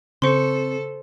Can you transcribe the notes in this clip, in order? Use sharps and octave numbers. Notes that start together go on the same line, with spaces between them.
C#3 C4 A4 C5 C6 C#6 C#7